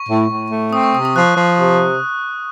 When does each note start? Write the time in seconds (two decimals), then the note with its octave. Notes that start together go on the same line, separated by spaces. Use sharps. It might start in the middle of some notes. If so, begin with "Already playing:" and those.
Already playing: C#6
0.09 A2
0.30 A2
0.51 A3
0.73 C4 D#6
0.84 C#6
0.94 C3 D#6
1.05 D#6
1.15 F3 F#6
1.37 F3
1.59 C3